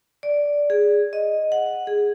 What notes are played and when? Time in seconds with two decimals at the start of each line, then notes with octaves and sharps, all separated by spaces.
0.23 D5
0.70 G#4
1.13 D#5
1.52 F#5
1.87 G#4